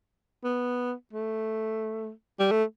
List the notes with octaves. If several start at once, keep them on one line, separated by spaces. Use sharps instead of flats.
B3
A3
G3
A3